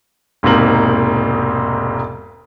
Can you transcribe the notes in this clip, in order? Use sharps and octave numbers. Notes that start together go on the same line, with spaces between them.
E1 G#2 C3 A#3 F#7